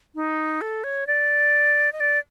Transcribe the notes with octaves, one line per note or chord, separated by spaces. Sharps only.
D#4
A4
C#5
D5
D#5
D5